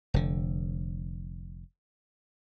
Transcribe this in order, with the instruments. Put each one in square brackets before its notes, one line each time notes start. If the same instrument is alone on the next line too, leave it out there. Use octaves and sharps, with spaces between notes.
[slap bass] F1 D3